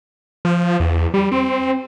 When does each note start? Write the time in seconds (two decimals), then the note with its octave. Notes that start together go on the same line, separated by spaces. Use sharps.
0.45 F3
0.80 E2
1.14 G3
1.32 C4